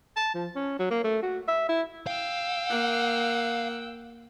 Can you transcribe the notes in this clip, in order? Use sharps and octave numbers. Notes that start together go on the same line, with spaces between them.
A5
F3
C#4
F#3
A#3
A3
F#4
E5
E4
F5 G5 E6
A#3 F#5